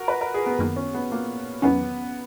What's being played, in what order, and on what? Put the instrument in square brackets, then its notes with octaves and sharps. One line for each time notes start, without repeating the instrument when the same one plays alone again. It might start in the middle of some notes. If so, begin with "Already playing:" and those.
Already playing: [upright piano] F#4 A#4
B4
A#4
G#4
B3
[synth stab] F#2 D#3 A#3 [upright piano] B3
[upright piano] C#4
B3
A#3
[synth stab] E2 D#3 F#3 C#4 [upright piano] B3